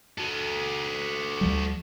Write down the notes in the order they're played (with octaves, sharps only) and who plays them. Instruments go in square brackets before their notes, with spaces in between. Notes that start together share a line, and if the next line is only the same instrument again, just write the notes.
[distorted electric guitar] F#4 A4
[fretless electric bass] D2 F3 G3